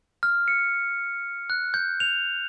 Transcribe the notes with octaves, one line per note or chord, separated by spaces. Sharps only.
F6
C#7
F#6
G6
F7